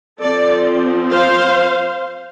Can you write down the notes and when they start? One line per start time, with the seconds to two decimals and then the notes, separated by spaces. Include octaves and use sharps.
0.21 F3 C4 A4 D5
1.12 C5 F5